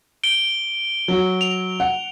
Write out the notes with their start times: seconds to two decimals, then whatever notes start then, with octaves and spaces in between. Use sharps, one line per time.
0.24 D7 G7
1.08 F#3 F#4
1.41 F7
1.80 F#5